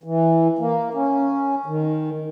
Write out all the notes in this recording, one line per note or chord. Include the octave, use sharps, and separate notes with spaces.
E3
A#3
C#4
D#3